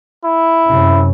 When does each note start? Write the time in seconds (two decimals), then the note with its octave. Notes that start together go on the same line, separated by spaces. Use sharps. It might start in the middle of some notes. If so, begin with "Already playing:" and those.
0.25 E4
0.66 F#2 C3 C#4